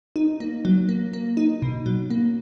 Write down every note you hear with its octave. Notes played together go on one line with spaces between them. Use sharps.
D#4
A#3
F#3
A#3
A#3
D#4
B2
F#3
A#3